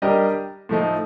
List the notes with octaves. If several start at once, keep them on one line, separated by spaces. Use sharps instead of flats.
G3 D4 G4 A#4 D#5
A2 F3 A3 D#4